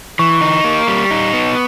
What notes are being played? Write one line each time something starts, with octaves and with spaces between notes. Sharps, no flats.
E3 C#6
D#4
A#3
G3
D#4
B3